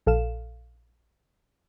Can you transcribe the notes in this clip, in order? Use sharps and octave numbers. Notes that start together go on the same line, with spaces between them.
A#1 A4 F5 E7